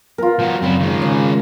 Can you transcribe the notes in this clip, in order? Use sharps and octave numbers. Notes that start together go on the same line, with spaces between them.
B3 F4 A#4
F3 F#4
F#2 C#3 C4 E4
D#3 G#3
C#3